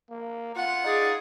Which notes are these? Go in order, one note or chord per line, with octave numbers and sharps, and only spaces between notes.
A#3
F4 F#5
D#4 G#4 D5